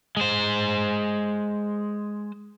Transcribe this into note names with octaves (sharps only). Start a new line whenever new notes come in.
G#3 C5